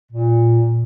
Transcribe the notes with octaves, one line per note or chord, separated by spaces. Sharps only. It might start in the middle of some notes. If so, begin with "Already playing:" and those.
A#2